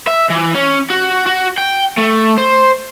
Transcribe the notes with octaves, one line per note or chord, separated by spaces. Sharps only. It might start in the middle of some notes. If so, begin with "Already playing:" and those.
E5
E3
C#4
F#4
F#4
G5
A3
C5